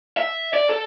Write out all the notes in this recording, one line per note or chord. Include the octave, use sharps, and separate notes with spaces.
E5
D5
A4